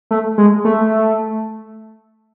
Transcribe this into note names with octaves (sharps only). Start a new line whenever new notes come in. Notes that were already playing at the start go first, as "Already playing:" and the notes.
A3
G#3
A3